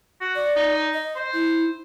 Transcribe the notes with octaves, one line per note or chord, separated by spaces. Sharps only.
F#4
D5
D#4
D#5
C5
E4